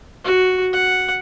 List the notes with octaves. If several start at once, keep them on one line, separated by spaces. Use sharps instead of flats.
F#4
F#5